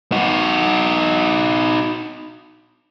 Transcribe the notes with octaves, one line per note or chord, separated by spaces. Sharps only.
D#4 F#4